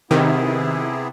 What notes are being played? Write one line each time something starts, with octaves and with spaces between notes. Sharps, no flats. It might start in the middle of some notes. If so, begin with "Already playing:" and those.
C3 D#3 B3 E4 G#4